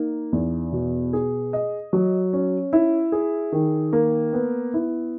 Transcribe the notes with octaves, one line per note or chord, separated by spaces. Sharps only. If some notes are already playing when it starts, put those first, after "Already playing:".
Already playing: A#3 D#4
E2
B2
G#4
D#5
F#3
C#4
E4
G#4
D#3
A#3
B3
E4